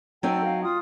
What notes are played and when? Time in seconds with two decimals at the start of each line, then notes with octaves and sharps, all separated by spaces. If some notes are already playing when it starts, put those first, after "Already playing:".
0.23 F#3 C4 D#4 A4 G5
0.44 F5
0.64 F4 D#6